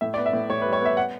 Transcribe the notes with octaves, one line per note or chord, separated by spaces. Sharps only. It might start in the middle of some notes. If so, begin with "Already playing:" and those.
A2 E5
B3 D5
E5
A2
A2 C#5
B4
G3
C#5
B3 E5
F#5